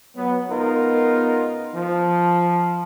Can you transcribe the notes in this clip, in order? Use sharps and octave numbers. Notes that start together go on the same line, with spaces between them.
F#3 B3
C#2 B3 D#4 F4 A#4
F3